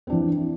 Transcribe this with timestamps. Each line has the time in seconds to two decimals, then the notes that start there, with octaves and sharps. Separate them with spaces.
0.07 C4
0.10 D4
0.12 E3